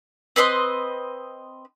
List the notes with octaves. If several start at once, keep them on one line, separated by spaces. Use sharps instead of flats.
C4 B4 D#5 C6